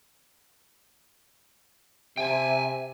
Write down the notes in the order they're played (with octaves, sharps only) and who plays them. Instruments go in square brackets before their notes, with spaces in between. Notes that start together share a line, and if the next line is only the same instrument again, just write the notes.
[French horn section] C3 [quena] E5 [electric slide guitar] G5 G#5